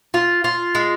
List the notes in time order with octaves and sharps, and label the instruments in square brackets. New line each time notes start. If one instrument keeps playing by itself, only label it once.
[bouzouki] F4
F4
G#3